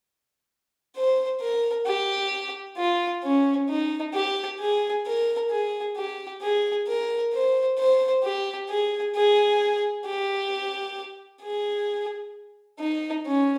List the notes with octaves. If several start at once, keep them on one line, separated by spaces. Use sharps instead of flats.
C5
A#4
G4
F4
C#4
D#4
G4
G#4
A#4
G#4
G4
G#4
A#4
C5
C5
G4
G#4
G#4
G4
G#4
D#4
C#4